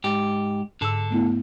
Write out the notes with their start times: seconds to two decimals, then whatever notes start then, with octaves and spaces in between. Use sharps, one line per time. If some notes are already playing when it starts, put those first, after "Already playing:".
0.04 G#2 G4
0.81 G#2 D3 A4 E6
1.11 A3 B3 E4